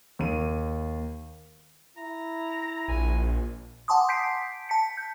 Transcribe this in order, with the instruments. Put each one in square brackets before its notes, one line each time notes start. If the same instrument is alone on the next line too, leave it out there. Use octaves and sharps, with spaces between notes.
[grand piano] D#2 D#7
[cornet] E4 [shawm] A#5
[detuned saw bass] A#1 [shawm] G#5
[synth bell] F#5 G#5 A5 C6 D6 D#6
G6 B6 C7 D7
A5 B6 C#7
G6